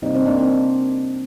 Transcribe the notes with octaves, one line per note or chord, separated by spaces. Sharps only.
C3 G3 A#3 C4 D#4
C4 D#4
A#3 D4
C4 D#4